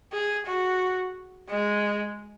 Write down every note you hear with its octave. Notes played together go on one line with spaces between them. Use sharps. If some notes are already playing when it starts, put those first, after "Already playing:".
G#4
F#4
G#3